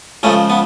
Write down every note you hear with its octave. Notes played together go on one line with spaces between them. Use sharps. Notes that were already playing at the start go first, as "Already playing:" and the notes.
C#2 C#3 F3 A3 C#4
B3